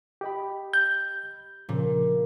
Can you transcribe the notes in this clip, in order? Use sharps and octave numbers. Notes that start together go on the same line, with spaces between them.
G4 D#5 B5
G6
A#2 C#3 F3